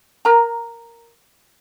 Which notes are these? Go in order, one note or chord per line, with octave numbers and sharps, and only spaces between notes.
A#4 A#5